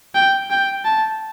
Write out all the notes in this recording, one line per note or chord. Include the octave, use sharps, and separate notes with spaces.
G5
G5
A5